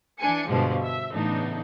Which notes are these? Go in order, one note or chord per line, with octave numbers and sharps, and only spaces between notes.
E3 D4 G#5 C#7
G2 B2 D3 F3 G3 G#3
E5
A2 C#3 E3 B3 D4 D#4